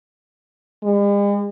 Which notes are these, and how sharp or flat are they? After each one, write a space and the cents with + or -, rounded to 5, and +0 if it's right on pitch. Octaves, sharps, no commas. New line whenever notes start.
G#3 -45